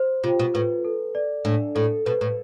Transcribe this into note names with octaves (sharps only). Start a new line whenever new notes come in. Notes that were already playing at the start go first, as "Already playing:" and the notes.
Already playing: C5
C3 F4
B2
A2 B4
A4
D5
A2 D4
A2 A4
B2 B4
A2